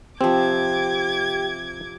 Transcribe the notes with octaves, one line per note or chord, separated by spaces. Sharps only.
C3 F3 C4 G4 D6 G#6